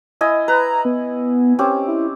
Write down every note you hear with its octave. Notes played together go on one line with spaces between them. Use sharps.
E4 D#5 G#5
B4 A#5
B3
C4 C#4 G4
E4